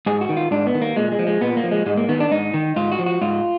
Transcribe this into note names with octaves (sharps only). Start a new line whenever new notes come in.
G#2 G#4
F#4
D#3
F4
G#2 D4
B3
D#3
A#3
A#2 G#3
G#3
F3
G#3
A#2 B3
A#3
F3
G#3
G#2 G#3
A#3
D#3 B3
D4
G#2 D#4
D#3
G#2 F4
F#4
F3
F#4
G#2 F4